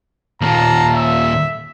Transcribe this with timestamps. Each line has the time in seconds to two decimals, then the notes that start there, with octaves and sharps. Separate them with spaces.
0.41 D#2 A#2 F5 A5 A#5
0.95 E5